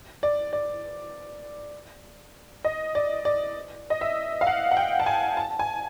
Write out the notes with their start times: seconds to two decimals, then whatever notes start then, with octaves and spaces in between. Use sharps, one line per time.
0.23 D5
0.53 D5
2.65 D#5
2.95 D5
3.25 D5
3.90 D#5
4.01 E5
4.41 F5
4.47 F#5
4.71 F#5
4.77 G5
5.00 A5
5.06 G#5
5.37 A5
5.59 G#5